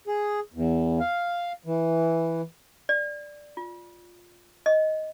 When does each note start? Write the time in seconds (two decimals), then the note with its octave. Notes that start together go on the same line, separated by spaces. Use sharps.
0.07 G#4
0.54 E2
1.00 F5
1.66 E3
2.89 D5
3.57 F4
4.66 D#5